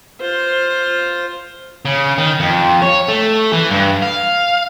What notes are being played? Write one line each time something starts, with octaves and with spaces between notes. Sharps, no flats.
F4 C5
C#3
D#3
F2
C#5
A3
E3
G2
F5